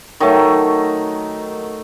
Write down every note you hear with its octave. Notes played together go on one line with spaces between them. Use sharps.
D#3 F#3 A3 D#5